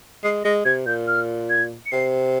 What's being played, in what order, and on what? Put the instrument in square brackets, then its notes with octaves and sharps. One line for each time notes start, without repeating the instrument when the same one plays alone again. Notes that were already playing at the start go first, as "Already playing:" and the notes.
[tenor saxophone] G#3 [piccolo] C7
[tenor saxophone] G#3 [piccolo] A#6
[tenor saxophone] C3 [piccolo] G#6
[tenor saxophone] A#2 [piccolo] G6
[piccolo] F6
G#6
C#7
[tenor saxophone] C3 [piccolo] C7